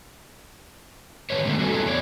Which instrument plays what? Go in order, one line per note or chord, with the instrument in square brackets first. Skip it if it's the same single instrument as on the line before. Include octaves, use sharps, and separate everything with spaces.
[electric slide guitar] D#3 G4 B4 C#5
B2 D3 D#3 G#3 A3 B3
G3 C#4 F#4 G4 A4
F#3 B3 E4 G#4 A4
E2 C#5 D5